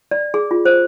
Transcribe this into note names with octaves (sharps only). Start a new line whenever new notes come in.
D5
G#4
F4
C5